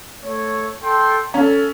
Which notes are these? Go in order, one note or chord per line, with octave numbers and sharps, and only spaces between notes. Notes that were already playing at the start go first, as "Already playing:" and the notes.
A3 C#5
A4 G5 C6
C#4 A4